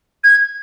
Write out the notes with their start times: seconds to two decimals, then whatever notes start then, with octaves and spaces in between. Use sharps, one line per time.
0.24 G#6